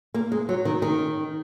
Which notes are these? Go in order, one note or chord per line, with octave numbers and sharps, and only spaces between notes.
A#3
G#3
F#3
D#3
D#3